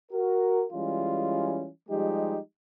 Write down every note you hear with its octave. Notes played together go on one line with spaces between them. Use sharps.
F#4 A#4
E3 G3 G#3 C#4 F4
F3 G3 G#3 D#4 G4